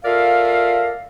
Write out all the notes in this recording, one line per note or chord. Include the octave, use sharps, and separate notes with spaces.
F4 A4 A#4 D5 E5 F5